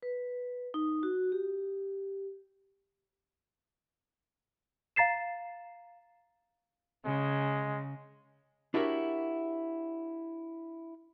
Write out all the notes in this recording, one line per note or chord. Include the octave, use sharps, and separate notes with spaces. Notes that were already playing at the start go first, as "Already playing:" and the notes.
B4
D#4
F#4
G4
F5 A#5 A6 C7 E7
C#3 G#3
D4 E4 F#4 G4 A#4 C#5